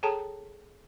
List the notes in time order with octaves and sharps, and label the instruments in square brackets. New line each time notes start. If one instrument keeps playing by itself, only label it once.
[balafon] G#4 A4 C#5 G5 A5 A#5